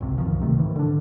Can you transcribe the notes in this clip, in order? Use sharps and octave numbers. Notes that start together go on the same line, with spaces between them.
G#1 C#2 C3
C2 F#2 D#3 F3
C3 D#3 A3
G#2 D#3 E3
D3 D4